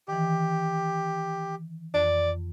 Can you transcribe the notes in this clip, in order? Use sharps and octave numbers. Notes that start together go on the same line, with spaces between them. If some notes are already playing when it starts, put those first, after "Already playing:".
D#3 E3 G4
F2 D5